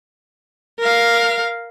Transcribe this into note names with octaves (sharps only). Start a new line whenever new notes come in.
A#4 F5